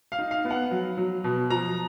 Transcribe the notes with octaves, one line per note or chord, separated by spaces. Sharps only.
F5
D#4
F5
B3
F#5
F#3
F#3
B2
F3 A#5